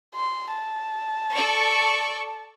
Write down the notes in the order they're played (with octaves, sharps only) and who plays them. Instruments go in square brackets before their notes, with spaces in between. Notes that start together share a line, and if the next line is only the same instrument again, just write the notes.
[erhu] C6
A5
[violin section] A4 D5 C#6